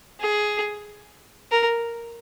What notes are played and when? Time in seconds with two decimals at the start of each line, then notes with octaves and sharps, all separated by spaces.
0.20 G#4
1.51 A#4